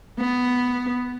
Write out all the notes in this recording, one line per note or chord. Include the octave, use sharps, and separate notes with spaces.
B3